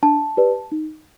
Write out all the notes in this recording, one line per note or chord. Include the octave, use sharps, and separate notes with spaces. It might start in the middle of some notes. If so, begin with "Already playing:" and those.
D4 A5
G4 B4 D5
D#4